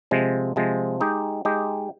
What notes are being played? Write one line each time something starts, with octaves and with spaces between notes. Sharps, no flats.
C3 F3 G#3
C3 F3 G#3
G#3 D#4 G4
G#3 D#4 G4